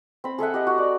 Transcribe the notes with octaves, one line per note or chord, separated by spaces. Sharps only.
C4 B5
G#4 A4 E5 F#5
G4 D#5
F#4
D5